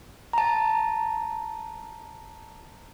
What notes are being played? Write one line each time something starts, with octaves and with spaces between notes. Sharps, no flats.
A5 A#5